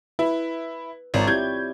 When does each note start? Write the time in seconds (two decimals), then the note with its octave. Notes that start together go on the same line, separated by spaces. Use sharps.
0.19 E4 B4
1.14 G#1 F4 C#5 D5
1.27 C4 E4 G4 G6 G#6